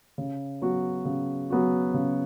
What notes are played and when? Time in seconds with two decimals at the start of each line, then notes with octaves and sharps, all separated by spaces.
0.18 C#3
0.62 F#3 B3 F#4
1.05 C#3
1.50 F#3 B3 F#4
1.94 C#3